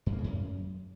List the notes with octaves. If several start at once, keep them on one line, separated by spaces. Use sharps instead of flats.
G2
A#3
C#3
F#2